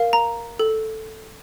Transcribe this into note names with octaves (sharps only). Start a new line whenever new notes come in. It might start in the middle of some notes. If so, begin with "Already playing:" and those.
Already playing: A#4 F5
A#5
A4